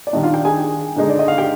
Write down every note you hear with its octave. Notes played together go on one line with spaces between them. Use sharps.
D5
D#3 G3 D4 D#5
F4 F5
G4 G5
G#4 G#5
D3 G#3 D#4
D5
D#5
F5
G4 G5